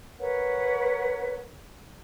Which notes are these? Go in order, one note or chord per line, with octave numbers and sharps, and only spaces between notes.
A#4 B4 C#5 F#5